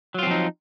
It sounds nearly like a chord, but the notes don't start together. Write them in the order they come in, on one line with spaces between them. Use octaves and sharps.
F#3 F4 C4 F3 D#4